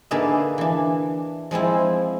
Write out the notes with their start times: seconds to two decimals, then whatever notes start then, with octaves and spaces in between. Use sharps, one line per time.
0.11 D3 A#3 D#4 G#4 B4 E5
0.58 E3 D4
1.51 F3 G#3 C4 E4